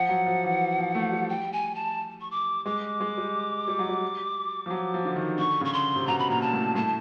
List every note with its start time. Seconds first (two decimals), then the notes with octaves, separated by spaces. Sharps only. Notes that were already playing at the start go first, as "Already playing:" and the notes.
Already playing: F3 F#5
0.09 F#3
0.26 F3
0.44 E3
0.78 F3
0.95 A3
1.12 G3
1.29 G5
1.53 G#5
1.75 A5
2.21 C#6
2.31 D6
2.66 G#3 D6
3.00 G#3
3.17 G3
3.68 G3
3.79 F#3
3.88 G3
4.66 F3
4.70 F#3
4.94 F3
5.05 D3
5.16 D#3
5.38 D3 C#6
5.61 C#3 C#6
5.73 C6
5.96 C3
6.07 B2 A#5
6.19 B5
6.29 A#2 A#5
6.42 A5
6.53 A2
6.75 A2 A5